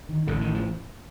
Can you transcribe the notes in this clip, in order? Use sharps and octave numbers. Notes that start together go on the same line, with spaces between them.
D#3
A1 A2 D3
D#3
F3